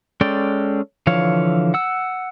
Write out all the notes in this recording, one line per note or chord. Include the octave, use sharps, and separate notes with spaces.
G#3 C#4 A4 D5 G5
D3 E3 F3 C#5 F5
F#5 E6